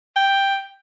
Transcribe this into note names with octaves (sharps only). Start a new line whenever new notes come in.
G5